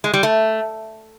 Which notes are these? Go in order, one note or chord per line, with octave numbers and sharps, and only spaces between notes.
G#3
G3
A3